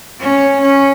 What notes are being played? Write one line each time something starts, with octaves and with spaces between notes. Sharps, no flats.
C#4
C#4